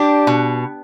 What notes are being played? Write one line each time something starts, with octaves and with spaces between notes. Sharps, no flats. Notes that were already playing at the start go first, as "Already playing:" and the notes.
Already playing: D4 G4
B2